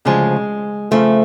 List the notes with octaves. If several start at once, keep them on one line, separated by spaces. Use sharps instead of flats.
D2 C#3 F3 G#3
F2 C#3 F3 A3